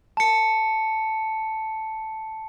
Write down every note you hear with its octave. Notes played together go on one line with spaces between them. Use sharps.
A5 C#7